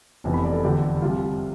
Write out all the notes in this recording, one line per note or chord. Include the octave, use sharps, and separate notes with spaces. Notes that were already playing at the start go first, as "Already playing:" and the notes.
F1 F2 E3 B3
B5
D5
A4
E2 D3 F3 G4
C2 C3 F3 F4